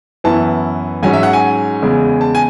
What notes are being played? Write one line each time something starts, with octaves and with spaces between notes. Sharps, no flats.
F#2 E3 B3 E4 A5
G#2 F#3 C#4 G#5
E5
F#5
G#5
E2 C#3 G#3
A5
G#5